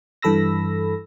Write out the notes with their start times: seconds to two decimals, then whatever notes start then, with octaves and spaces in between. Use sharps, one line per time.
0.22 G2 E3 A4 B5 E6 A#6